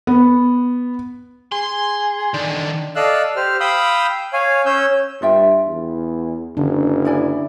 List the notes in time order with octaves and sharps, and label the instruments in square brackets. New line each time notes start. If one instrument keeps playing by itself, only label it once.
[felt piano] B3
[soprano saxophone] G#4 [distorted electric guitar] C6
[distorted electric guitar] D3 D#3 [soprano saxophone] D4
[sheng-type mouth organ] A4 D5 D#5 F5 E6 F#6
G4 C5 F6
F5 G5 B5 D#6 E6 G6
C#5 F5 G#5
C#4 C#5 E6 G6
[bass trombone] G2 [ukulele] F4 E5 G5
[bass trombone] E2
[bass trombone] F#1 [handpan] D3 C#4 D4
[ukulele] E4 D5 G#5